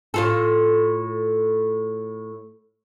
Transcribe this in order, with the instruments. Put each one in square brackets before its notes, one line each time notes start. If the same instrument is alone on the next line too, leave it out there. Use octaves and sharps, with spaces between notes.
[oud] A2 F4 A4